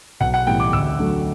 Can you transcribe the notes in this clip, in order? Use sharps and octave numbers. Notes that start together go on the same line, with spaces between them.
B1 F#5
F#5
A2 E3 G3 B3 G5
D6
D2 E6
D3 F#3 A3